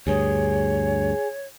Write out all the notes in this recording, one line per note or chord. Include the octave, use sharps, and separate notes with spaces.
D2 G2 G#4 C#5